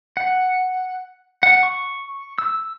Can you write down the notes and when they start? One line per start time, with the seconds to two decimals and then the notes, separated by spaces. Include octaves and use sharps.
0.17 F#5
1.43 F#5
1.63 C#6
2.38 E6